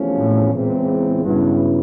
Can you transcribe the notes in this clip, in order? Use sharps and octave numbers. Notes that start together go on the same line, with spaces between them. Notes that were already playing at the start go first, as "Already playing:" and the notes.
Already playing: E2 C3 F3 A3 C#4
A2
E2 A#2 C#3 E3 G#3 C4
G2 C#3 F#3 B3 E4